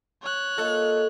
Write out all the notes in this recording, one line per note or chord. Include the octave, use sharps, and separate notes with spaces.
C#5 F#6
A#3 F4 A4 D#5